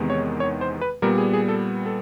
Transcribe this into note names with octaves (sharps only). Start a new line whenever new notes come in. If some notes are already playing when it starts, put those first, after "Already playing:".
Already playing: E2 C3 D#3 G#3 B3
C#5
C#5
C5
B4
A#2 G3 B3 A#4
G#4
G#4
A4
A4